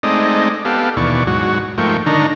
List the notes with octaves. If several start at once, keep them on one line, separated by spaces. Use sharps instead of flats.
G#3 A3 C4 D#4 D5 D#5
B3 G4 A4 F5
D#2 B2 E3 D5 C#6
G#2 F#3 F#4
G#2 F3 A3 A#3 G5 C#6
D3 D#3 D4 D#4 A#5 C#6